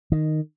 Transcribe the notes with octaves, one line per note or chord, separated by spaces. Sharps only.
D#3